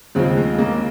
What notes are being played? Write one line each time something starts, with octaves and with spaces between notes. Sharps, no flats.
D#2 C#3 F3 G#3 C4
G#3
A#3